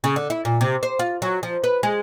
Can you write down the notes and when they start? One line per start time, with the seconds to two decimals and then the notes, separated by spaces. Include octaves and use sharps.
0.04 C#3
0.16 D3
0.30 E4
0.45 A#2
0.61 C3
0.83 C5
0.99 F4
1.22 F#3
1.43 F3
1.64 B4
1.83 G#3